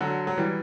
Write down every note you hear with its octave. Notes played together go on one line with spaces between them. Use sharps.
D3 F#3
F#3
E3 G3